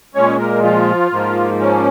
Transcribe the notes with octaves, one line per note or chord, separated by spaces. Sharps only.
A#2 G#3 C#4 C#5
A#3 A#4
F3 F4
G#2 F3 A#3
C#4